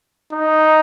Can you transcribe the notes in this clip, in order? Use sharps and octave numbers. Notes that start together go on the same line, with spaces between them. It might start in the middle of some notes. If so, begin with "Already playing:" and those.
D#4